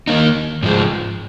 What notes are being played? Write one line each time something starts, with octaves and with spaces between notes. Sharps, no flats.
D#3 A#3 D#4
G#2 F3 G#3